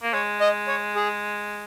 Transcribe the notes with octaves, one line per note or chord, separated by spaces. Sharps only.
A#3
G#3 C#5
D#5
C#5
G#4